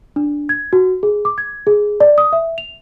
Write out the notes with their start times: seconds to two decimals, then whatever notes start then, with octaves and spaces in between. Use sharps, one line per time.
0.16 D4
0.49 G#6
0.73 F#4
1.03 G#4
1.25 D6
1.38 G#6
1.67 G#4
2.00 D5
2.18 D#6
2.33 E5
2.58 F7